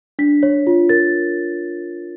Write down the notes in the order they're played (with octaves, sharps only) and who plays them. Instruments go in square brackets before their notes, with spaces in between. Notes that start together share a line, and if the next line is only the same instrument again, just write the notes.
[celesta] D4 B6
C#5
F4
A#4 A6